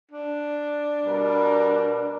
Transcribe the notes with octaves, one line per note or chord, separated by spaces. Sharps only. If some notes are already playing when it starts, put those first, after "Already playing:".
D4
B2 G3 A#4